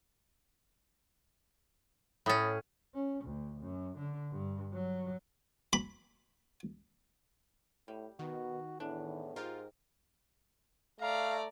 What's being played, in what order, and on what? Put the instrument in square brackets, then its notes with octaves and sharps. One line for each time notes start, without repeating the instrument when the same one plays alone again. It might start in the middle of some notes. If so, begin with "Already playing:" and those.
[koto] A2 C#4 [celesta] B5 D#6 A6
[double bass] C#4
D2
F#2
D3
G2
F#3
[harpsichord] B5
[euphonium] A2 [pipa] G3
[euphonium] B2 [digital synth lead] D#3 [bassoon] F#4
[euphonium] E2 [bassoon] A2 [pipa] D4
[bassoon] G#2 [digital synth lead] F4 [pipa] G4 A#4
[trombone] A3 [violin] D5 A#5 [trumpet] F5